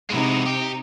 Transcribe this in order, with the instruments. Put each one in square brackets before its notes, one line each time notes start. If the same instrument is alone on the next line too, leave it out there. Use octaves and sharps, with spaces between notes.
[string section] C3 D#4 [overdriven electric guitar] G#3 E4
[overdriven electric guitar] G4